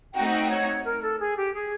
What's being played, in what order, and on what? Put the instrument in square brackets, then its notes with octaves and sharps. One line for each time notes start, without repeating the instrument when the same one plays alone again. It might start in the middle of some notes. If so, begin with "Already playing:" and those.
[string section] A3 C4 D#4 F#4 [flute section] G5
[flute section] G5
C#5
A#4
A4
G#4
G4
G#4